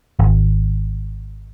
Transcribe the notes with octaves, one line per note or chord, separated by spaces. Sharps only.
G#1